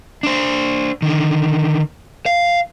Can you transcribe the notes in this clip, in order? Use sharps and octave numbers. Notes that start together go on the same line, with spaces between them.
D4 C5
D3 D#3
F5